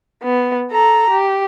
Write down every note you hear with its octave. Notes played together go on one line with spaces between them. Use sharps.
B3
A4 A#5
G4